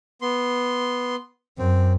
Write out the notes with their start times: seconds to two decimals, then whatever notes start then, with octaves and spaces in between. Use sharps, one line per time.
0.22 B3 C6
1.58 F#2 C4